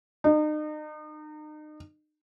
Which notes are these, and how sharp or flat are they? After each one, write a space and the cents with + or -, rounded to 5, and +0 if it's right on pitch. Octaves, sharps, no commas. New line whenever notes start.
D#4 -35